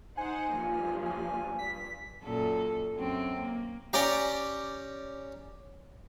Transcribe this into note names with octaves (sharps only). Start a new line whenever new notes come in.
D#4 C5 F#5 G#5
G2 F3 A#3
G#5
G2 B6
F#2 A#2 A4
F#2 C4
A#3
C#4 G4 D5 G5 A#5